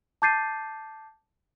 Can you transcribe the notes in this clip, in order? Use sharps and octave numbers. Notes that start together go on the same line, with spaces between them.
A5 D6 G6 A6 C7 D#7